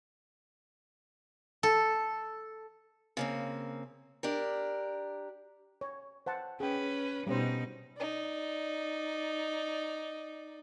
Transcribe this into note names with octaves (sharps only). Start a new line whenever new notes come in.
A4
C#3 A#3 C4
D4 G4 A#4
C#5
C5 F#5 A5
C#4 G#4 B4 G5
B2 G3 C#4 D#4 C5
D#4 D5